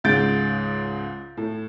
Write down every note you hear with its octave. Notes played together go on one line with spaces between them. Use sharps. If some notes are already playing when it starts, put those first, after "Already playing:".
C#2 G#2 C#3 G6 A6 D7
A2